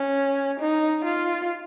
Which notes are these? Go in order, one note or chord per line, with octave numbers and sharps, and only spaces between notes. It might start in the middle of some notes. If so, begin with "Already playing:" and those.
Already playing: C#4
D#4
F4